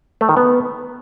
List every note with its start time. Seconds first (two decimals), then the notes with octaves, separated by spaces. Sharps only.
0.21 A3
0.29 D#3
0.37 B3